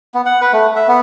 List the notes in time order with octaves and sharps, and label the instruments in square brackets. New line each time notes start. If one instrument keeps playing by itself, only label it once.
[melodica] B3
F#5
B4
A3
E5
B3